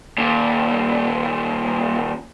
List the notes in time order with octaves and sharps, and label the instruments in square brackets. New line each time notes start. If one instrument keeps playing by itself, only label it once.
[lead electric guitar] D#2 A#2